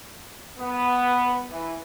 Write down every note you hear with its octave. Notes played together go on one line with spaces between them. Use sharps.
B3
E3